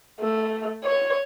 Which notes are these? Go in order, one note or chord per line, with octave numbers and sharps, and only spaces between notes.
A3
C#5